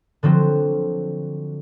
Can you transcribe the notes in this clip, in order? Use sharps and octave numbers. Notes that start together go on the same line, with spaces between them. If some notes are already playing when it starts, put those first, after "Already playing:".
D3 F3 F#3 C4